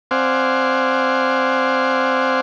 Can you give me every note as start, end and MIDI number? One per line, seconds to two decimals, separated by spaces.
0.11 2.41 60
0.11 2.41 72
0.11 2.41 74
0.11 2.41 77
0.11 2.41 78
0.11 2.41 80